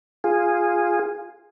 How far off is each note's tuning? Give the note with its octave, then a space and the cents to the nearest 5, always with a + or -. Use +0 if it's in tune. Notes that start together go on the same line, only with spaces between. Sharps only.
F4 +0 G#4 -10